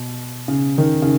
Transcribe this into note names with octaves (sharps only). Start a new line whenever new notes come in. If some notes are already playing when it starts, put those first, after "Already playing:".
Already playing: B2
C#3
D#3
C#3